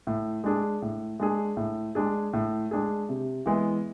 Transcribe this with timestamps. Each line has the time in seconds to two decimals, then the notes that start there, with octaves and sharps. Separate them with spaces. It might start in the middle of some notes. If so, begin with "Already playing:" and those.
0.07 A2
0.44 G#3 D4 G#4
0.82 A2
1.20 G#3 D4 G#4
1.57 A2
1.95 G#3 D4 G#4
2.33 A2
2.71 G#3 D4 G#4
3.09 C3
3.46 E3 G#3 B3